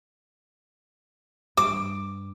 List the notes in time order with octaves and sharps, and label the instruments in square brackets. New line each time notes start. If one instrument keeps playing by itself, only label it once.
[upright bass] G2 [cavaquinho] D6